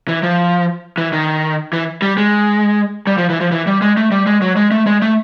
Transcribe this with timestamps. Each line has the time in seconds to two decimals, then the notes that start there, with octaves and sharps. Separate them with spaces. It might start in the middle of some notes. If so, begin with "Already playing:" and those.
0.08 E3
0.23 F3
0.98 E3
1.13 D#3
1.73 E3
2.02 G3
2.17 G#3
3.07 G3
3.18 F3
3.30 E3
3.41 F3
3.52 E3
3.67 G3
3.82 G#3
3.97 A3
4.11 G3
4.27 G#3
4.42 F#3
4.56 G#3
4.71 A3
4.87 G#3
5.02 A3